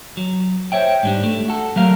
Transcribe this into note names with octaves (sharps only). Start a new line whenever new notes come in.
F#3
C5 C#5 E5 G5
G#2 G3 D4
A3
F#4 A4
F#3 G3 A3 A#4 F5